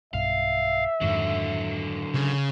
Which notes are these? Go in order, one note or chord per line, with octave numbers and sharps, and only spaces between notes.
B1 G2 E5 F5
F2 G#2 D3 D#3 F#3
C#3